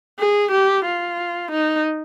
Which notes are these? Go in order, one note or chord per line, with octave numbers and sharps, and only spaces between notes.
G#4
G4
F4
D#4